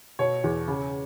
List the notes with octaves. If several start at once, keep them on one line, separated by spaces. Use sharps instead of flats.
B2 C#5
E2
C#3